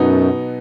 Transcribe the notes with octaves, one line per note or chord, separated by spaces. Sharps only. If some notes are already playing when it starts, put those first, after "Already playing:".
Already playing: F#2 B2 F#3 B3 D#4